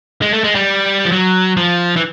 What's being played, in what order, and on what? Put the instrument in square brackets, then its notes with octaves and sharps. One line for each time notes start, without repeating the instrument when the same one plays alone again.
[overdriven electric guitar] G#3
A3
G#3
G3
F3
F#3
F3
E3